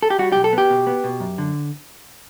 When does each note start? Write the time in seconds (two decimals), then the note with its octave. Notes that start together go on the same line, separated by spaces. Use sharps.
0.03 A4
0.10 G4
0.19 G3 F#4
0.32 B1 G4
0.44 A4
0.53 B3 G4
0.70 B2
0.87 B3
1.04 B2
1.20 F#2
1.38 D3